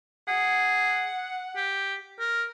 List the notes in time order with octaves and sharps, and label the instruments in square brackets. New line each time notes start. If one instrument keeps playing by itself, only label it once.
[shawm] G#4 [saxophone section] F#5
[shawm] G4
A#4